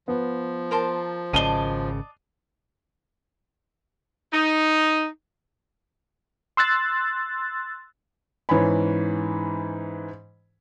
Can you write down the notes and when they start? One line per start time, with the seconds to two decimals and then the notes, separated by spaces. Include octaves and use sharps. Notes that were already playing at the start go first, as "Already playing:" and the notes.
0.08 F3 B3
0.71 A#4 C5 A5
1.33 G#1 C#3 D5 D#5 A5 D#7 G7
4.34 D#4
6.57 C6 E6 F#6 A6
8.49 G#2 E3 C#4 G#5 B5